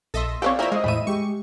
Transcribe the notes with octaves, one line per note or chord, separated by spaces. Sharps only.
A#1 A4 D#5 E5 C6
C4 E4 G4 A4 B4 C#5 D5 F5
F3 A#3 E4 A#4 E5
G#3 C5 D#5 F5
E2 A2 E5 B5 D#7
G#3 G4 C#6